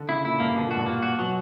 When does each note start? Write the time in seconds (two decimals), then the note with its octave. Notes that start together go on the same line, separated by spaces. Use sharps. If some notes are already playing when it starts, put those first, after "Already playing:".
Already playing: D3
0.09 C#3 E4
0.24 A#2 E4
0.40 G2 A#3
0.56 B2 D3
0.66 A#2 F#4
0.76 G2
0.86 A#2 A#3
1.02 F#4
1.19 B2 F#3